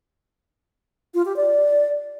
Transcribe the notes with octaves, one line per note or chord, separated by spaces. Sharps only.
F4
G4
D5